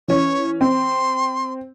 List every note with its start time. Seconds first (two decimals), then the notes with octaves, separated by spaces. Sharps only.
0.08 E3 C#4 C#5
0.61 C4 C6